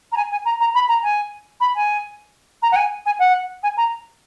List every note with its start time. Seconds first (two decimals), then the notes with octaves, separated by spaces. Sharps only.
0.12 A#5
0.16 G#5
0.31 G#5
0.45 A#5
0.60 A#5
0.74 B5
0.88 A#5
1.03 G#5
1.60 B5
1.75 G#5
2.62 A#5
2.71 F#5
2.75 G#5
3.05 G#5
3.19 F#5
3.62 G#5
3.77 A#5